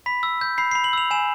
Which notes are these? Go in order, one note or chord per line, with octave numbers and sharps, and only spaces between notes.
B5 B6
E6
G6
B5 C7
B5 C7
F#7
E6 F7
G#5 E7